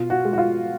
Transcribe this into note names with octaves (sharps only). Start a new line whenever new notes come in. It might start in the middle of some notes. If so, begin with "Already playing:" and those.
Already playing: B2 F4
F#4
G#3
F#4
F4